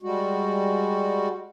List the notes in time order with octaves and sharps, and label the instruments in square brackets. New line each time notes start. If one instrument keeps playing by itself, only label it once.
[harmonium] G3 G#3 F#4